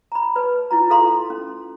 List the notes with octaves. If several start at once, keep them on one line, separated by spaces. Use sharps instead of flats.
A#5 B5
B4 A5
E4 F4 A#5
F4 A4 F5 A#5 C6
C#4